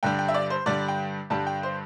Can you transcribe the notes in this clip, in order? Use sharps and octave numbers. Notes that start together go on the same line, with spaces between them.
G2 D3 G3 G5
G5
E5
D5
C5
G2 D3 G3 D5
G5
G2 D3 G3 A5
G5
C5